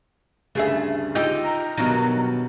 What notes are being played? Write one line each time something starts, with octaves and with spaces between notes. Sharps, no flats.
D2 G2 C#3 A3 G#4 E5
D#4 F4 G4 E6 G6
A#5
G2 B2 D#3 F#3